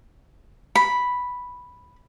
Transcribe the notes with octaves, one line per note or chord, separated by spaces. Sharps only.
B5